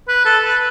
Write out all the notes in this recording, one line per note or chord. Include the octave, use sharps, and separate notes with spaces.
B4
A4
B4